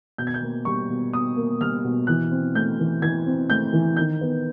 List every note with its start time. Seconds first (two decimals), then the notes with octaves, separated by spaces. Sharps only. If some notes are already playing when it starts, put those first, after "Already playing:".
0.18 B2 G6
0.27 G#6
0.34 G6
0.42 A#3
0.65 G3 C#6
0.89 B2
1.13 B2 D#6
1.36 A#3
1.61 G3 F6
1.84 B2
2.07 E3 F#6
2.31 C4
2.54 A3 G6
2.79 E3
3.02 E3 G#6
3.26 C4
3.50 A3 G6
3.73 E3
3.97 D#3 G6
4.21 B3